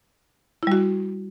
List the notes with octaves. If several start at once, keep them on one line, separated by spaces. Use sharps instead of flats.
G3 E4 F#4